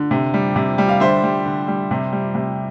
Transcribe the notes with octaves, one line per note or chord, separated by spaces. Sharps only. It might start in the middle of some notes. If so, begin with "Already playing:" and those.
Already playing: D3
C3
G3
C3
G3
F5
D3 C5 E5
G3
D3
G3
C3
G3
C3